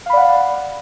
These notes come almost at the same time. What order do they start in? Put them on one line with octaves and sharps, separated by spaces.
F5 B5 D5 F#5